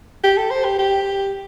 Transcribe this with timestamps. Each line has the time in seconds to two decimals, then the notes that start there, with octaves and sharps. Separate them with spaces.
0.24 G4
0.37 A4
0.51 C5
0.65 G4
0.79 G4